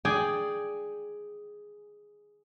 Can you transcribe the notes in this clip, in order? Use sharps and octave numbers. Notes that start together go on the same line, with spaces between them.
G#4 D5 G5 G#5